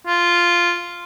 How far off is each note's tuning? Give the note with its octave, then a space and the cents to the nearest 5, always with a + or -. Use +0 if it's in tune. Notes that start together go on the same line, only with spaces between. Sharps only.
F4 -5